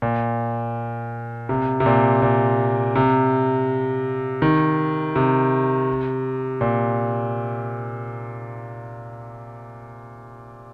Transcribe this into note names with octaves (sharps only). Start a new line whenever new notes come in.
A#2
C3
C3
A#2
A#2
C3
D#3
C3
A#2